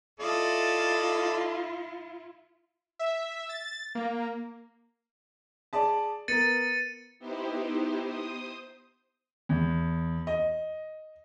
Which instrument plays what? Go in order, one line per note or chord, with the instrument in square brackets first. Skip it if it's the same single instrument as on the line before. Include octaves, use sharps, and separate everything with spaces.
[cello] E4 F4 [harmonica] A4 D5 D#5
[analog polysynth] E5
A6
A#3
[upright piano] G#4 D5 A5
[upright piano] B3 A#4 [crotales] A6 C#7 D#7
[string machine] B3 D#4 E4 G4 C5
C5 D#6
[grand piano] E2
D#5